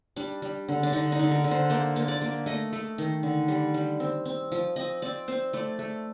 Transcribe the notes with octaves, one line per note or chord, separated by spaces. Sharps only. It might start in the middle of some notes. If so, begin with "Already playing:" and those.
G3 D4
G3
D3
D4
D3 D#4
D#4
D3
A#4
D3
C5
A#3 C5
A#3
D5
A#3
A3 D#5
A3
D#3
D3
G3
G3
C4
C4
F3
C4 D#5
C4 D5
C4 C5
A3 D5
A3